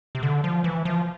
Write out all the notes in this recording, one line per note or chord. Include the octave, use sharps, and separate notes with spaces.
C3
D3
F3
E3
F3